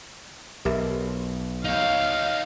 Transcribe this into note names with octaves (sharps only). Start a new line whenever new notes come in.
B1 G4 A#4 E5
D#4 C#5 F5